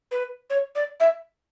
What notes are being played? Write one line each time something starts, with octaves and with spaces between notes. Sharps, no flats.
B4
C#5
D5
E5